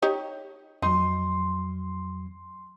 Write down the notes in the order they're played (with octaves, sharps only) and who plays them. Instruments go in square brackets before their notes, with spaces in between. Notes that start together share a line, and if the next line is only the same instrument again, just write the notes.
[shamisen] D#4 G4 C#5
[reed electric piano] F2 F#3 [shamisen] D#4 [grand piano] C6